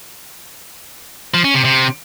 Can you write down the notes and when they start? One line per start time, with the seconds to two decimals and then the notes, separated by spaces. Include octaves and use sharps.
1.34 F3
1.44 C#4
1.54 C3
1.65 C3